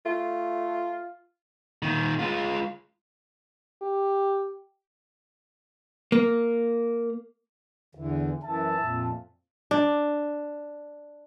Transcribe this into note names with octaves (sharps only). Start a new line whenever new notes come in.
A3 F4
A#2 D#3
G#3 F4
G4
A#3
E2 D3 E3
F#2 E3 E5 A5
F2 A#2
D4